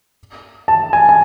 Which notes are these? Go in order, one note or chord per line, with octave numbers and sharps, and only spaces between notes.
A5
G#5
G#5